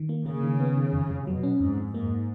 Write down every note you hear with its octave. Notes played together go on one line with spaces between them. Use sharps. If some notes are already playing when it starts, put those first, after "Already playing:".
Already playing: D#3
A#3
C#3 A#3
D#3
B3
D#3
F2
F2
B2 F#3
C#4
F2 G#2
F2
G#2 A#3